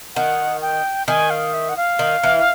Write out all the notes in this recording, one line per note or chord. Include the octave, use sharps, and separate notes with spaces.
D#3 F#5
G5
D#3 G#5
F5
E5
F#5
F5
D#3
E3